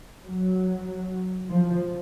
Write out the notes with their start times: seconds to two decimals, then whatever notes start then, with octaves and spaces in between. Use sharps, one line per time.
0.24 F#3
1.50 F3